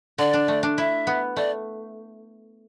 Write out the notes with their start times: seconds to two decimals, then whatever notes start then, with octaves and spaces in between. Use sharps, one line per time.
0.18 D3 D5
0.33 D4
0.48 A3
0.63 D4
0.78 E4 E5
1.07 B3
1.37 A3 D5